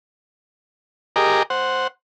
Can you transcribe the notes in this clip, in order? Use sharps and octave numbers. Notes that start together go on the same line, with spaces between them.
G4 G#4 A#4 D#5 A#5 D6
C5 F#5